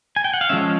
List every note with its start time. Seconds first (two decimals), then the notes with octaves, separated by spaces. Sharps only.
0.16 G#5
0.24 G5
0.34 F#5
0.41 F5
0.49 F3 G#3 C#4 E5